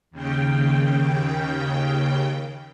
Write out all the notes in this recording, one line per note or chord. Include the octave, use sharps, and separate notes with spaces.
D#2 C#3 G5